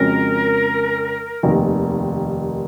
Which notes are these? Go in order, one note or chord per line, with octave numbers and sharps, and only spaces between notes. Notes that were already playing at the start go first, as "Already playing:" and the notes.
Already playing: F2 C#3 G#3 C#4 F#4 A#4
F1 D#2 D#3